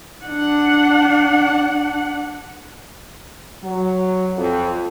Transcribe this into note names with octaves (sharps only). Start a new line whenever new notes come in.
D4 F#5
F#3
F2